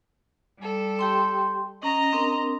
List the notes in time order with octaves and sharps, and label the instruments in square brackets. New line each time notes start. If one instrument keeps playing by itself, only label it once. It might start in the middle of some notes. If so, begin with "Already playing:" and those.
[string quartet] G3 A4
[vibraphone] G4 G5 C6
[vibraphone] C#4 [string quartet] D#5 A#5
[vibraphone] C4 D4 A#4